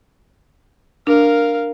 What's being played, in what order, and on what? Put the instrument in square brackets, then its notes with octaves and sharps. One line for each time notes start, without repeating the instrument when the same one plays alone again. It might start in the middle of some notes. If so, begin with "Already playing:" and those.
[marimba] D4 [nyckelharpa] A#4 F5